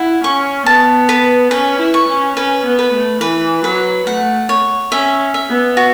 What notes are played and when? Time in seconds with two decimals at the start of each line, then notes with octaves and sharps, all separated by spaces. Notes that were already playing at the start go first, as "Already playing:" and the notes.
Already playing: E4 F#5
0.24 C#4 C#6
0.66 B3 A5
1.09 B4
1.51 C#4 B4
1.80 E4
1.94 C#6
2.08 C#4
2.36 C#4 B4
2.65 B3
2.79 B4
2.93 A3
3.21 E3 B4
3.64 F#3 B4
4.07 A3 F#5
4.49 C#5
4.92 C#4 E5
5.34 E5
5.49 B3
5.77 F#4